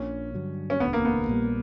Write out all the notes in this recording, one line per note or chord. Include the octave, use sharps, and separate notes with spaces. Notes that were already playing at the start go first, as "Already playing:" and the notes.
Already playing: A#1 A#2 A#3 C#4 D4
G2 D3 F#3
C#4
E1 D2 D3 B3
A#3
B3
A#1 A#2 G3